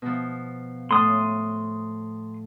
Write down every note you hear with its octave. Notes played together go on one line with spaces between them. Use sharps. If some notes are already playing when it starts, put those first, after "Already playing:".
B2 F3
A2 C6 D#6